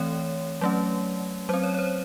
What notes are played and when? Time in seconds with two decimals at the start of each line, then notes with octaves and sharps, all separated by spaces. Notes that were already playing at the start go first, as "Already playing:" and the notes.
Already playing: E3 A3 C4 C#5
0.61 F#3 A3 C#4
1.49 F#3 C4 C5
1.64 C#5
1.74 C#5
1.79 C5